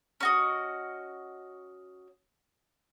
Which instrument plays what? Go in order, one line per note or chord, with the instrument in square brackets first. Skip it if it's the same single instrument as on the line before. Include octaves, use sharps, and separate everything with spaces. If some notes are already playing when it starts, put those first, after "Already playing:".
[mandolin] C#4 F#4 D#5